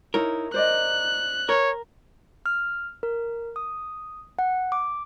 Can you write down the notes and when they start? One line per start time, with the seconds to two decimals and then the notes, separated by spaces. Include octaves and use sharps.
0.14 D#4 E4 A#4 C#5
0.54 C5 D5 D#5 F#6
1.49 A#4 C#5
2.46 F6
3.03 A#4
3.56 D#6
4.39 F#5
4.72 D6